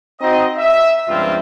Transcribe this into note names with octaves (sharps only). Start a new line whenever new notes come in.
C4 D#4 F#4 D#5
E5
C#2 G2 F3 C4 F4